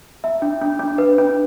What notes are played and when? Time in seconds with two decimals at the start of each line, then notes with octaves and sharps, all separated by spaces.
0.24 E5
0.42 D4
0.62 D4
0.79 D4
0.98 B4
1.18 D4